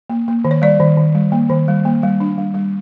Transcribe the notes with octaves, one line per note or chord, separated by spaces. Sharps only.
A#3
A#3
D#3
C#5
G3 D5
D#3
D#3
G3
A#3
D#3
G3
A#3
G3
D4
G3
G3